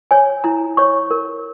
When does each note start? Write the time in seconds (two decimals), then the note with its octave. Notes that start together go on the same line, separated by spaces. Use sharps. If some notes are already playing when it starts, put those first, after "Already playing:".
0.11 C#5 G#5
0.44 E4 A#5
0.77 C#5 C#6
1.11 A#4